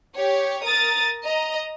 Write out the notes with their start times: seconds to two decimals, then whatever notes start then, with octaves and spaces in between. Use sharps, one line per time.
0.14 G4 C#5
0.65 A#4 D#6 A6
1.24 D#5 A#5